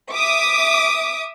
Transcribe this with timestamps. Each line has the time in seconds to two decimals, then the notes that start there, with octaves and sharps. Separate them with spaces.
0.12 E5 D6 D#6